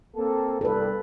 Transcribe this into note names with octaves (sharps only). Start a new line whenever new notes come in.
A#3 C4 A4
C2 G2 A4 B4